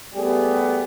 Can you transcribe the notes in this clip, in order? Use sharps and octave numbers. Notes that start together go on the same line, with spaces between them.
G3 A3 B3 G4 G#4